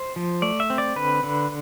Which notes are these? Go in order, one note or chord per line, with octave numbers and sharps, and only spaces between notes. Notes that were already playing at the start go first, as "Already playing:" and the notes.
Already playing: C5
F3
A3 D5
E5
C4
D5
D3 B4
D3